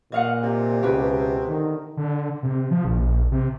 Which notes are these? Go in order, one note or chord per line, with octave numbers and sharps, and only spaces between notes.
A#2 D#5 F5 F#5
C3
C#2 B2 G4 B4
D3 D#3
D3
C3
F3
A#1
C3